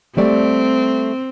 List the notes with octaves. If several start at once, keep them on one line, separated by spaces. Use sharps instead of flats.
G3 A3 C4 D5